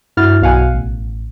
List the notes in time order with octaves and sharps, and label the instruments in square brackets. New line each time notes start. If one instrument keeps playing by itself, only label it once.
[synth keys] G2 E4 F#4 F6 A6
B1 B2 F5 F#5 G#5
A1